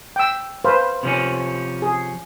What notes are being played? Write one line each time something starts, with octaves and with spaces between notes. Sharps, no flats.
G5 E6
B4 C5 F5
C3 F3 C#4
G#4